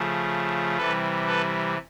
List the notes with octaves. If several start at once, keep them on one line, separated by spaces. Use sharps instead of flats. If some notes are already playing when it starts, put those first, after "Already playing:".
Already playing: C#3 F3 A3
C3 E3 G3 A4 B4
A4 B4